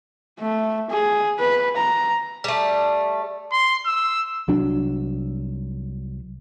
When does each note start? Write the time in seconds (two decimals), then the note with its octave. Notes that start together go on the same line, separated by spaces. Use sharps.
0.39 A3
0.90 G#4
1.39 B4
1.77 A#5
2.44 G3 A3
3.52 C6
3.86 E6
4.48 C2 F#3 D4